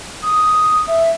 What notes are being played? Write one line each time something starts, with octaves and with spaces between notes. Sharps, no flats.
D#6
E5